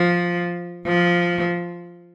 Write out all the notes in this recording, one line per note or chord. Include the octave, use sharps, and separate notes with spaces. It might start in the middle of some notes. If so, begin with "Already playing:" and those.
Already playing: F3
F3